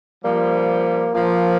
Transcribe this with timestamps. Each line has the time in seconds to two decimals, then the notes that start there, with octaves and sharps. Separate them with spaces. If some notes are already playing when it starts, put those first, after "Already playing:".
0.24 F3 G3 A#3
1.15 F3 A#3